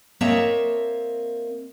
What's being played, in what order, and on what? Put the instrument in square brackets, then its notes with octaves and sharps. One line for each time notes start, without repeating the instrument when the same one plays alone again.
[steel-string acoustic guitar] A#3 C4 C#5 D#5 E5 A5